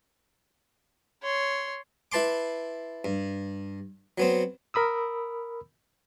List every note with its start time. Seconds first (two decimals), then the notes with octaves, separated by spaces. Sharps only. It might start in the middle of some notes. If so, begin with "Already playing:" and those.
1.23 C#5 C6
2.12 E4 B4 A5 C6 D6
3.05 G2
4.18 F#3 B3 C4
4.74 A#4 B5 D#6 E6